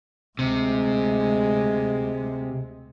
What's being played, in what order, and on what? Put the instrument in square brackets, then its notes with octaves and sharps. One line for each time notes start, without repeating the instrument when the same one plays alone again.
[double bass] D2 G#3 [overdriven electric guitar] C3